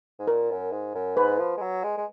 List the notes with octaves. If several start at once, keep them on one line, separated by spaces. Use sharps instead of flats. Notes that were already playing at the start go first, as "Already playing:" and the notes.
G#2
A#2 A#4
F#2
G#2
F#2
G#2 B4
F3
G#3
F#3
G#3
G#3